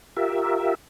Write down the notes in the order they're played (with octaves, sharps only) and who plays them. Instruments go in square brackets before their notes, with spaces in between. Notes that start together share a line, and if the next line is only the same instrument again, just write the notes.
[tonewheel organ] F4 G4 A#4 E5